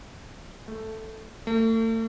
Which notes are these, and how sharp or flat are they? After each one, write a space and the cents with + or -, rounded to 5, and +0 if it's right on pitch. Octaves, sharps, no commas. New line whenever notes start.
A3 +0
A3 +40